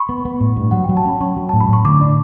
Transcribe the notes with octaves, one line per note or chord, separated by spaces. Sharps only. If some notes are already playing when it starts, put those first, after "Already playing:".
Already playing: B5 C#6
B3
B3
A2
G2
F#3 F#5
F#3 G5
A5
C#4 B5
C#4 C#6
F#3
A2 A5
B5
A2 C#6
D3 D6
D4